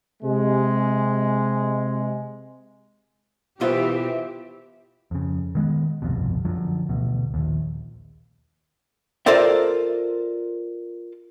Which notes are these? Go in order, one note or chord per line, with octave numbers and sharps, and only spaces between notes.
C3 G#3
B2 E3 F4 G4 A#4 C5 E5 F5
F2 C#3
D#3 G#3 B3
G1 C2 F2 B2
F#2 D3 F3 F#3
A1 D2 B2
A#1 D#2
F4 A4 A#4 C5 D5 E5